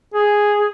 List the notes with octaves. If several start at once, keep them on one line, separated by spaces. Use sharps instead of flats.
G#4